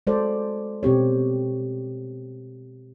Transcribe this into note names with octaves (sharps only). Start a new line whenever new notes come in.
G#3 F#4 A4 C5 D5
B2 C4 G4 C#5